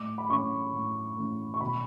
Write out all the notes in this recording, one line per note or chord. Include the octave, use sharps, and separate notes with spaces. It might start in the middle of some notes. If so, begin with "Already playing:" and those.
Already playing: A2 D6
B5
E3 A3 C#4 C#6
A2
E3 A3 C#4
C#6
B2 B5